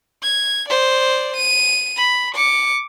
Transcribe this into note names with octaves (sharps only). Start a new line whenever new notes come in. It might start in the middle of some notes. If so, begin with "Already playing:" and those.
G#6
C5 D5
D#7
B5
D6 C#7